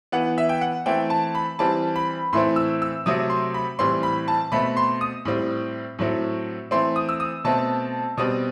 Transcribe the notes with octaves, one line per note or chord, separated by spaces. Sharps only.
E3 B3 F#5
E5
G5
F#5
E3 A3 C4 G5
A5
B5
E3 G3 C4 A5
B5
A2 E3 A3 C4 C6
E6
E6
C3 F#3 A3 C4 D#6
C6
B5
A2 E3 G3 C4 C6
B5
A5
B2 A3 C4 B5
C6
D#6
A2 G3 C4
A2 F#3 A3 C4
E3 A3 C4 C6
D#6
E6
D#6
B2 A3 C4 A5
B2 G3 C4 D#6